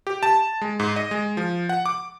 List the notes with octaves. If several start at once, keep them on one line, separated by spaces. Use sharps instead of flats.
G4
A5
G#3
G#2
D#5
G#3
F3
F#5
D6